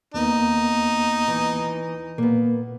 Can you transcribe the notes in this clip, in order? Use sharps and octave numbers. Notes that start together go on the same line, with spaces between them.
D#2 A#3 B3 D#4
E3
A#2 A#3 B3